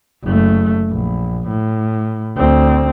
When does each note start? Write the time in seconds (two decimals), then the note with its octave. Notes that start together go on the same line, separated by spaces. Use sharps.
0.24 F#1 A3
0.89 A#1
1.48 A2
2.36 D2 C4